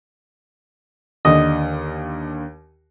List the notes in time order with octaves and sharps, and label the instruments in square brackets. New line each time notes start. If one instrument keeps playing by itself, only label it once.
[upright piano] D#2 D3 [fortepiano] D#5